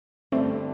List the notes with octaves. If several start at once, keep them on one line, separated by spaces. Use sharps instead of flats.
G2 D3 G3 A3 C4